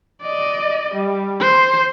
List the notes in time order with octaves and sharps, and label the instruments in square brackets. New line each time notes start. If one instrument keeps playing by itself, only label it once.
[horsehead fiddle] D5 D#5
G3
C5